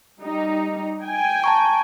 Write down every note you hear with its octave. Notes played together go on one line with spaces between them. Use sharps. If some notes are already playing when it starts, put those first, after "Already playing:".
G3 D#4
G5 G#5
A5 A#5 C#6